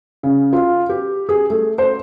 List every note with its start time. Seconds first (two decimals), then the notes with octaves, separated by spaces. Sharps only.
0.23 C#3
0.53 F4
0.89 G4
1.29 G#4
1.50 A3
1.78 C5